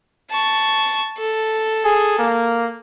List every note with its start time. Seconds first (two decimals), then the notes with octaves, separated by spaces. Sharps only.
0.30 A5 C#6
1.18 A4
1.85 G#4
2.19 A#3